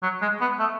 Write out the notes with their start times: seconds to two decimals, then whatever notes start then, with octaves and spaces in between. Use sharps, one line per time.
0.03 F#3
0.22 G#3
0.41 B3
0.59 A3